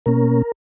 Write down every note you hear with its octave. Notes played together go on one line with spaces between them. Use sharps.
B2 A#3 C#4 A#4